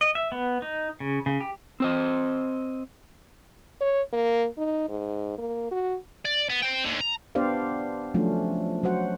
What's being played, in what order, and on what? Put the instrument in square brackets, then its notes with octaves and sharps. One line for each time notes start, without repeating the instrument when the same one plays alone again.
[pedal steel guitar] D#5
E5
B3
D#4
C#3
C#3
G4
[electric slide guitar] C4 C5 D#5
[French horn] C#5
A#3
D#4
G#2
A#3
F#4
[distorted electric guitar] D5
B3
C5 G5
D#2 D3
A#5
[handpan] B3 D4 G4 C5 D5 F5
F3 F#3 A3 C#4 D4
F#3 F#4 C5 F#5